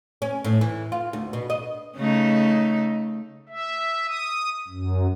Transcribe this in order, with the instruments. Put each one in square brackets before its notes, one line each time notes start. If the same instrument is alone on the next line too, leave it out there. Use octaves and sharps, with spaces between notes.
[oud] C#4
A2
E3
F4
D2
B2
D#5
[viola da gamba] C#3 A3 D#4
[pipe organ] E5
D#6
F#2